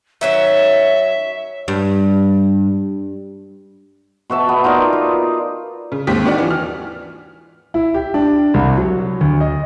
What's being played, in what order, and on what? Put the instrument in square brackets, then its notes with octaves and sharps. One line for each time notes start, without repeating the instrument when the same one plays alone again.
[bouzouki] D#3 F#3 C#4 [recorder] E5
[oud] G2
[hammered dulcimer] B2 F#4 E5 A5
B3
D#4 F4 A#4 D5
F4
[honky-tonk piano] C#3
D#2 G#2 C4 G4 B6
D#3 F#4 D5 F#5 D6
E3 F3
F6
[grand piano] E4
G4
D4
C2
F#3
D2
D#5